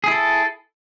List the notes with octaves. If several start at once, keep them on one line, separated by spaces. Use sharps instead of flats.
E4 G#4 A4